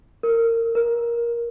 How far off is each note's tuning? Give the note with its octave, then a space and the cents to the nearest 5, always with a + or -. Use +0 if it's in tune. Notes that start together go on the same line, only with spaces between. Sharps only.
A#4 -25
A#4 +15